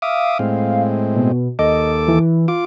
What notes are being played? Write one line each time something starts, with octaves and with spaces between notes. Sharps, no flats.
E5 F5 D6 D#6
A2 G#3 C4
B2
D#2 A4 D#5 D6
E3
F4 D6